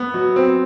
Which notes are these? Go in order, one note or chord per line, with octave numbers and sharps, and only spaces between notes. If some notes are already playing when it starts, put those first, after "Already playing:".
Already playing: B3
F#3
C4